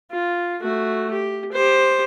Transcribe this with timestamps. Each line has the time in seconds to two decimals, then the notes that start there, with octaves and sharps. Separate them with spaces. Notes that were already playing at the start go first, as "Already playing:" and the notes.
0.11 F4
0.62 A3 F#4
1.11 G4
1.52 G4 C5